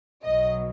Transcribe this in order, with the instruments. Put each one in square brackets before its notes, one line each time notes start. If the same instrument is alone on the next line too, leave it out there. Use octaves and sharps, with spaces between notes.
[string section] B1 B2 F#3 D#5